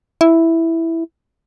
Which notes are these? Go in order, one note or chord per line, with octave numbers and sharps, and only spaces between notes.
E4